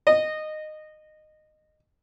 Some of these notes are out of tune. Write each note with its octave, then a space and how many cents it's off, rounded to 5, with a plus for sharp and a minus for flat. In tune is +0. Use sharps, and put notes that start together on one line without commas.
D#5 -15